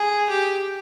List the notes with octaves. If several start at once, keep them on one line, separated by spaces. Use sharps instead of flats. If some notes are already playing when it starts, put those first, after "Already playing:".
Already playing: G#4
G4